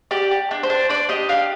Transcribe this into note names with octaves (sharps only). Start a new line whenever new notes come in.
G4 D5
G4
D4
C5
D4
D4 D5
G4 D#5
D4 F5